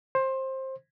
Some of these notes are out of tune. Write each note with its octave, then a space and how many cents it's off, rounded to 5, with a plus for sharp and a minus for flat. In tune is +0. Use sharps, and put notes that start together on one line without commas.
C5 +20